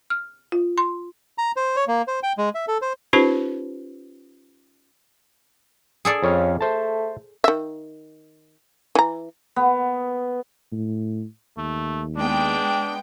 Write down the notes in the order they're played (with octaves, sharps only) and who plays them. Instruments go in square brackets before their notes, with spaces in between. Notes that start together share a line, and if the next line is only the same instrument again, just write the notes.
[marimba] F6
F4
C6
[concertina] A#5
C5
C#5
A#3
C5
G5
G#3
E5
A4
C5
[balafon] C#4 D#4 F4 G4 B4 C5
[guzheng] G#4 A4 D5
[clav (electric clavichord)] F2 C#5 F5 [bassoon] C#4
[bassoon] A3 [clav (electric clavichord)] C5 A5
[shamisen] D#3 E5
E3 A#5
[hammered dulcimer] B3
[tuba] A2
[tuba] D#2 [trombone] A3
[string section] G#3 B3 G5 [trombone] D4